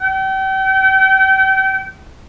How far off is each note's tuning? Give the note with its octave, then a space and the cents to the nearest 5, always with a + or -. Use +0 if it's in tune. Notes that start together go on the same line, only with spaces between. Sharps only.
G5 -35